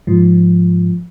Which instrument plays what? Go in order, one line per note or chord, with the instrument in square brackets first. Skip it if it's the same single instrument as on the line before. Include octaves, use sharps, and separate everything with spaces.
[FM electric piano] G#2 F3